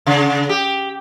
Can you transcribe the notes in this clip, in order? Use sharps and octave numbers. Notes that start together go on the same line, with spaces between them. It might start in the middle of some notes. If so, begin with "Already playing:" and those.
C#3
G4